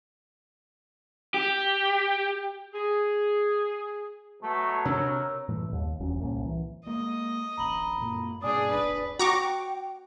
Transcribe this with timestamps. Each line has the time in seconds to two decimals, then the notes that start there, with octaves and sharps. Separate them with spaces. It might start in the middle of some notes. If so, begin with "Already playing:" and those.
1.34 G4
2.73 G#4
4.43 B2 F#3 A3
4.85 C3 D4 A#4 C#5 E6
5.49 A2 E3 G3 A3
5.73 D#2
6.00 F1 E2 F#3 C#4
6.20 C2 A#2 A#3 C#4
6.45 E3
6.86 G#3 A#3 D#5
7.57 D1 A1 A#5 B5 F#7
8.00 F#2 A#2 A#3
8.42 G2 B2 A#3 D4 G#4 D5 G#5 D#6
8.71 D1 G1 D4 B4
9.19 F#4 G5 A#5 C#6 D6